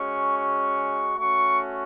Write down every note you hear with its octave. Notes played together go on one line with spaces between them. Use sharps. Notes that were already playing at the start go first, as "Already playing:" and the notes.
Already playing: G#3 C#4 F#4 C#6
C#6
A3 C#4 F#4 C#6